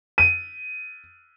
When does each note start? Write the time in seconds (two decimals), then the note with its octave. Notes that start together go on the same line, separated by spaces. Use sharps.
0.18 D#7